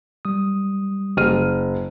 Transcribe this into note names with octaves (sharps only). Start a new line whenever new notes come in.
G3 D#6
F#1 F6 D#7